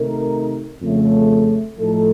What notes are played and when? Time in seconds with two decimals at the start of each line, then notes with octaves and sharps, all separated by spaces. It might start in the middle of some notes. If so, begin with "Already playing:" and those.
Already playing: C3 D#3 A3 D#4 A#4
0.81 F2 C#3 A3
1.78 A2 F3 A3 D#4 A4